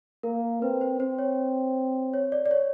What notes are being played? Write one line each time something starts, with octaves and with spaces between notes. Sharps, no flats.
A#3 A#4
C4 B4
C5
C4 C5
C#5
C#5
D5
D5
C#5